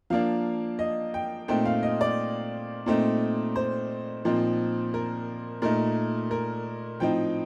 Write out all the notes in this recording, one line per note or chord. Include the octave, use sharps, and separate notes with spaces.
F3 A#3 D4 F5
D#5
G5
A#2 A3 C4 D#4 G5
F5
D#5
D5
A#2 A3 C4 D#4
C5
A#2 F3 C4 D#4
A#4
A#2 A3 D#4 A#4
A#4
A2 F3 C4 D#4 G5